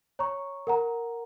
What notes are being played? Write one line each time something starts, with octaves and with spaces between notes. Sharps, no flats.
C#5 A#5 C#6
A#4 F#5 A#5